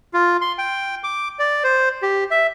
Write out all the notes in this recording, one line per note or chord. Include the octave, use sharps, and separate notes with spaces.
F4
C6
G5
D6
D5
C5
G4
E5